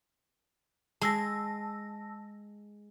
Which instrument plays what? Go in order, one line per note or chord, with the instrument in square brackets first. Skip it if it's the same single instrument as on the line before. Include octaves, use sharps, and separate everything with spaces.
[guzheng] G#3 [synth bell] A5 E6 A#6